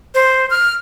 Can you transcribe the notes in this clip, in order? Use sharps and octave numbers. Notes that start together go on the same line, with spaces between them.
C5
F6